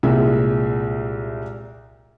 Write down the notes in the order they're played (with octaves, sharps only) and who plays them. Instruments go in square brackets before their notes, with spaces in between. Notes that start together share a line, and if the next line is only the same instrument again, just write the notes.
[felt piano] C2 A#2 G#3 E5